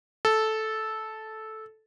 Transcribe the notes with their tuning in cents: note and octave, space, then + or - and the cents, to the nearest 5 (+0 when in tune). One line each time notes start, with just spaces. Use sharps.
A4 -10